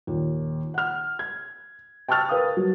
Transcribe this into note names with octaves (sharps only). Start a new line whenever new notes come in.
D#2 A#2
F#5 F6
G#6
G5 A5 C#6 E6 F6 A6
A#4 B4 F5 D#6
F#3